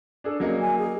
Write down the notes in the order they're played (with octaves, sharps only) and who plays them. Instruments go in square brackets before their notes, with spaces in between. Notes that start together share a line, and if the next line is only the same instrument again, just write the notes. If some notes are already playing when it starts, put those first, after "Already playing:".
[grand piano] D4 G#4 A4
[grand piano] F#3 A#3 D#4 [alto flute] C#4
[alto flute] G#5
G#4